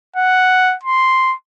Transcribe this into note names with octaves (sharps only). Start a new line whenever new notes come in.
F#5
C6